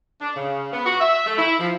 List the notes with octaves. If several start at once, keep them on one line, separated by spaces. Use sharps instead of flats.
D4
C#3
B3
F#4
E5
A3
E4
F3